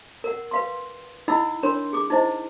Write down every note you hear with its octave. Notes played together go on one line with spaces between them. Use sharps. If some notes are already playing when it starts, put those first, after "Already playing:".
A#4 F#5
B4 F5 C6
D#4 E4 D#5 F#5 B5 E6
D4 A#4 C#5 C6
G#4 D6
D#4 E4 C5 D#5